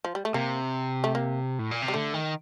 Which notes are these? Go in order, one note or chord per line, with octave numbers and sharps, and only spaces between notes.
F3
G3
A3
C3 A#3
A3
A#3
A2
A#2
C3
G3
D3 A3
D#3